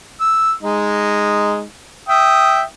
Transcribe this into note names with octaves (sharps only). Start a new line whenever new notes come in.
E6
G#3 D#4
E5 G5 D#6